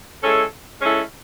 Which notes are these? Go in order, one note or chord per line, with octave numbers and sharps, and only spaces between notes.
G#3 C#4 E4 A4
G#3 C#4 E4 A4